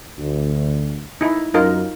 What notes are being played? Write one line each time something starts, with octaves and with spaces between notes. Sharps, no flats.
D2
D#4 E4
F#2 D#4 F4 A#4